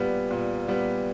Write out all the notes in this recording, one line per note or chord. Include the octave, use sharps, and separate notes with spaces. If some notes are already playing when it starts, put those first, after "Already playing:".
Already playing: A#2 G3 B3
A#2
G3 B3